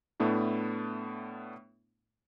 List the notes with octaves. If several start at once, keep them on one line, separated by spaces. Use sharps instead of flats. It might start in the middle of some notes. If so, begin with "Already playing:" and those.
A2 A3 B3 D4 E4